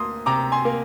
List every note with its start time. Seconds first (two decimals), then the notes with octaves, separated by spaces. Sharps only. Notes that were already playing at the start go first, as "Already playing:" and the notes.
Already playing: D2 A#3 C6 D#6
0.26 C3 A#5 D6
0.52 G#5 C6
0.65 A#3